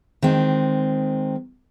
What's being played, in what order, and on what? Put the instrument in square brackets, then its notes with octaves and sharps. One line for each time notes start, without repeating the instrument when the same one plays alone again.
[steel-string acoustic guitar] D#3 G#3 C4